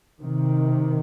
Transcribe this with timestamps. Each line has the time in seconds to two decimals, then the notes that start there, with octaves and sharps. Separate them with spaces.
0.20 C3 D#3